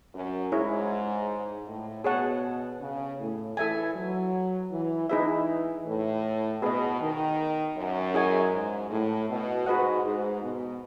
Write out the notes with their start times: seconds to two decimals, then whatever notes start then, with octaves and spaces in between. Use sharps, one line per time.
0.14 F#2
0.52 G#2 E4 G#4 C#5
1.67 A2
2.04 B2 G#4 C#5 F#5 A5
2.80 C#3
3.18 A2
3.57 E3 A4 E5 G#5
3.95 F#3
4.71 E3
5.09 E3 D#4 G#4 B4 E5
5.86 A2
6.62 B2 G#4 B4 D#5
7.00 D#3
7.77 F#2
8.14 E4 G#4 D#5 G#5 C#6
8.52 G#2
8.90 A2
9.29 B2
9.66 G#2 F#4 B4 D#5 F#5
10.04 G#2
10.42 B2